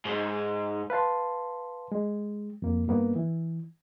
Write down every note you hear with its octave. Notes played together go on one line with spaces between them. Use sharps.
G#2
B4 F5 A5 C6
G#3
F2 A#3
G2 A#3 B3
E3